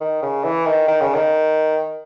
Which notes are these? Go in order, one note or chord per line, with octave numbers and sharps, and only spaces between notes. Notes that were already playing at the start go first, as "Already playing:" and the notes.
D#3
C#3
E3
D#3
D#3
C#3
D#3